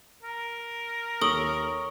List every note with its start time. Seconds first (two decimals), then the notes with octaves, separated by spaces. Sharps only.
0.23 A#4
1.22 D#2 A4 C#5 D#6 G7